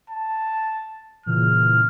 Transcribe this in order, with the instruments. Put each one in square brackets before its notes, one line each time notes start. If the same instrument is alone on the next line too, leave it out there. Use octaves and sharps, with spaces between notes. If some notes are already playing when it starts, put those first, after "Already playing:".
[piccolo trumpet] A5
[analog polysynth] A#2 C#3 E3 [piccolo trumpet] F6